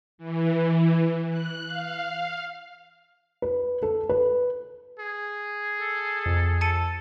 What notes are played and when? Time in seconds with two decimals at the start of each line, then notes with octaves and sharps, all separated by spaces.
0.18 E3
1.30 F#6
1.66 F5
3.42 B4
3.83 A4
4.09 B4
4.99 G#4
5.81 A4
6.26 F2 C3
6.61 A4 A5 C#7 D#7